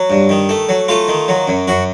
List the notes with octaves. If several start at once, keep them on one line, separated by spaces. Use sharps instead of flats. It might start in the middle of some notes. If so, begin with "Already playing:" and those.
Already playing: F#3
G2
D#3
A3
F#3
A3 F4
D#3
F#3
F#2
F#2 F#4